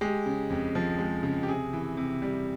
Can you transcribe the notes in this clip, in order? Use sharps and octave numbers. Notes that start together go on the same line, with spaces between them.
G#3 G4
C#3
F2
F3
G#3
C#3
G4
C3 G#4
E3
C3
G3